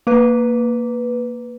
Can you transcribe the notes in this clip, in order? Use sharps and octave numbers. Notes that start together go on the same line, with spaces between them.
A#3 B4